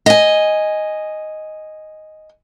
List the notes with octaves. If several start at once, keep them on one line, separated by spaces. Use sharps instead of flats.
D#5 G#5